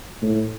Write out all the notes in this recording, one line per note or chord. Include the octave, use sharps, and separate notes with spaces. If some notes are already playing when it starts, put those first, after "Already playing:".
A2